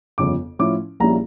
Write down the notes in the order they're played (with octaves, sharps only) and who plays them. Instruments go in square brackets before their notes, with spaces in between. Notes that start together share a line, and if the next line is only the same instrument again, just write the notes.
[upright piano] G1 F2 C#3 D6
A2 F3 C#4 E4 D6
A#1 A#2 G3 C#4 E4 A#5